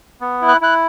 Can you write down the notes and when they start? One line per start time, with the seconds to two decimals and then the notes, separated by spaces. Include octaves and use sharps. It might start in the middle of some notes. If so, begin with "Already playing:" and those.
0.21 B3
0.42 E4
0.48 F#6
0.61 E4 F#6